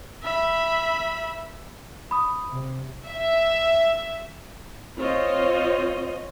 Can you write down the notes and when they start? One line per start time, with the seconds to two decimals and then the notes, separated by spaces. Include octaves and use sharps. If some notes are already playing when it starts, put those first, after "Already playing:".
0.23 E5 B5
2.11 B5 D#6
2.48 C3
3.07 E5
4.97 C4 F4 C5 C#5 D#5